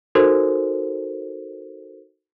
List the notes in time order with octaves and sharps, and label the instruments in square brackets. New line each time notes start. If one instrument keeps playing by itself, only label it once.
[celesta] D#4 F#4 A4 A#4 C5